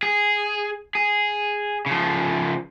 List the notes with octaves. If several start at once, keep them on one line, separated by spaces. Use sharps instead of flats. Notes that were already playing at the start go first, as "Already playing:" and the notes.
G#4
G#4
C#3 F3